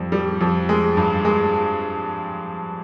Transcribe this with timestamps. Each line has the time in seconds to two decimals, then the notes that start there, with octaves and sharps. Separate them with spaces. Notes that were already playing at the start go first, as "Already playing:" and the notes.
Already playing: F2 G3
0.12 G3
0.41 F2
0.69 G#3
0.97 G2
1.25 G#3